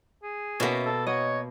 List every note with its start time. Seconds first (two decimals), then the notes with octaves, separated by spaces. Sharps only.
0.23 G#4
0.60 B2 A#3 C#4 F#4 E5
0.85 A4
1.07 F#4 C#5 D#5